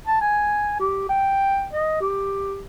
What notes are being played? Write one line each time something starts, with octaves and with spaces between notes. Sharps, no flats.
A5
G#5
G4
G5
D#5
G4